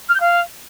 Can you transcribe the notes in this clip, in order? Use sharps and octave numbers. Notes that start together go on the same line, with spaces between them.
F6
G6
F5